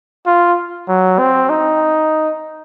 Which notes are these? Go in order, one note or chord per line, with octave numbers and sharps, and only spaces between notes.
F4
F#3
C4
D#4